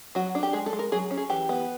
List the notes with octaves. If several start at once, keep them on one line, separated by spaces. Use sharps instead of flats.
F#3 F#4
D4
G4
G#3 G#4
A4
G#3
A#4
F#3 G#4
C#4
G#4
E3 G4
B3